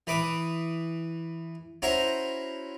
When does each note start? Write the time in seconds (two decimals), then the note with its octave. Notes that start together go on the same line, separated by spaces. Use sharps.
0.07 E3 B4 D6 D#6
1.82 C#4 E4 F#4 C5 A#5